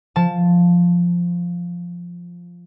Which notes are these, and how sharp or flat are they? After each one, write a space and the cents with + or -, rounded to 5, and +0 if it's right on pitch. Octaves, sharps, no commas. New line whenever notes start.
F3 +0 A5 +0